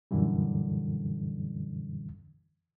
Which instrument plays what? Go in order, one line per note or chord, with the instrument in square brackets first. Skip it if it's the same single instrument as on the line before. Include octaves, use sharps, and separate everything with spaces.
[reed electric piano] F#2 A#2 D3 E3 G3